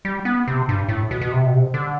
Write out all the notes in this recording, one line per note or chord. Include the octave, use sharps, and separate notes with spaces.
G3
B3
C3
G2
A2
B2
B2
C3
B2
C3
D3